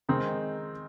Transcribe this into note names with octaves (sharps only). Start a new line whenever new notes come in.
D#3 G#3 C4 D#4